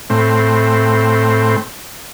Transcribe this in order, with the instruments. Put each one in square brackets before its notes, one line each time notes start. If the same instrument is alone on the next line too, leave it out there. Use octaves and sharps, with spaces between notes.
[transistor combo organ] A2 C4